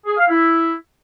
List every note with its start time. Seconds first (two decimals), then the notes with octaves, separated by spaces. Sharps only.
0.06 G#4
0.17 F5
0.28 E4